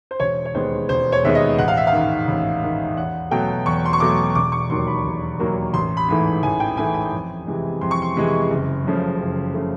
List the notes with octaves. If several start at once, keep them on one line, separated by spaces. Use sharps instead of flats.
C5
E1 C#5
C#5
D#2 D#3 G#3 B3 C5
E1 C5
C#5
D#2 D#3 G#3 B3 E5
D#5
A1 F#5
F5
E5
F5
G#2 D#3
A1
G#2 D#3
E2 F#5
B2 F#3 A3 G5
E2 C#6
C6
C#6
B2 F#3 A3 D6
E1 D6
C#6
D#2 D#3 F#3 A#3 C6
B5
E1
D#2 D#3 F#3 A#3
A1 C6
B5
G#2 E3 A3
A1 G#5
G5
G#2 E3 A3 G#5
G#5
F2
C3 E3 G#3
F2 C6
C#6
C6
C3 E3 G#3
F#1
F#2 C#3 F3 A3
F#1
C#3 F3 A3